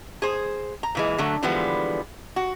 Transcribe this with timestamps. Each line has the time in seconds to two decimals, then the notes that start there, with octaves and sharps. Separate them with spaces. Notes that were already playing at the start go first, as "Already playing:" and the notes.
0.22 G#4 C5
0.83 A#5
0.95 A#2 E3 G#3
1.18 D3 F#3 A3
1.43 D3 E3 F3 G3 G#3 B3
2.36 F#4